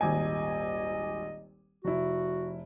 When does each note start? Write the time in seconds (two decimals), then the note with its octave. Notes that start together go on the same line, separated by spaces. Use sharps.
0.01 D#1 G#1 D#5 G#5
1.85 F1 E4 F#4